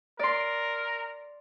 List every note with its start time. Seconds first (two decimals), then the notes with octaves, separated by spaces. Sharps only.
0.19 A#4 D5 C6